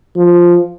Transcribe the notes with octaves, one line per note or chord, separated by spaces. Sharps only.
F3